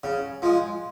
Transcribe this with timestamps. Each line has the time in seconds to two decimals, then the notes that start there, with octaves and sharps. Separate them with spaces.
0.04 C#3
0.42 F3 G#3